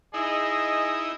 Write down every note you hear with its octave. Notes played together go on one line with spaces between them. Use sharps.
D#4 E4 G#4 D#5